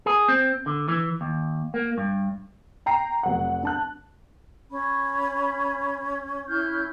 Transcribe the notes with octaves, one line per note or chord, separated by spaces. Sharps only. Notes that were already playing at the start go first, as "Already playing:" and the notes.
G#4
C4
D3
E3
D#2
A#3
G2
G5 A#5 C7
F1 F#3 F#5
D4 A5 F#6
C#4 B5
E4 F6 G6